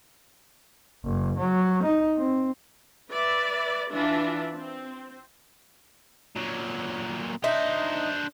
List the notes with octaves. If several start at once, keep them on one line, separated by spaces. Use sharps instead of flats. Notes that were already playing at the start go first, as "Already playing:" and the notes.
F#1
F#3
D#4
C4
B4 D5 E5
E3 D4 F4 E5
C4
A#2 F#3
D4 D#4 C5 E5